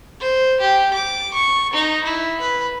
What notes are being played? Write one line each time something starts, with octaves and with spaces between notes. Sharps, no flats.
C5
G4
D6
C#6
D#4
E4
B4